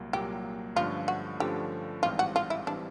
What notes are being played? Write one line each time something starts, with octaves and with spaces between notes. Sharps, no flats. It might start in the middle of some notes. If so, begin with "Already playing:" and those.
Already playing: C2 A#2 F#3 A#3
C2 A#2 F#3 A#3 G4
G2 D3 F3 A3 C#4 F4
F#4
G2 D3 F3 A3 C#4 G4
A1 G#2 E3 G3 C4 F4
F#4
F4
E4
E3 G3 C4 D4